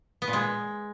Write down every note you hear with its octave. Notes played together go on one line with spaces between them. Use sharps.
B3
A#2
G#3